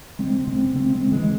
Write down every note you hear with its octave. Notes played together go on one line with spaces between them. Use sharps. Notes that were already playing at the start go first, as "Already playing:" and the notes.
C#3 G#3 C4
C#3 G#3 C4
C#3 G#3 C4
G#3 C4
C#3
E3 G#3